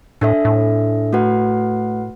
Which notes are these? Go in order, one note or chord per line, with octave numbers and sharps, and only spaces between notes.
A2 D4 A4 E5
A2
A3 F#4 B4 F#5